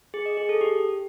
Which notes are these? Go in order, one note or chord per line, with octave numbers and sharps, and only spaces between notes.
G#4
D#5
G#4
A4
G4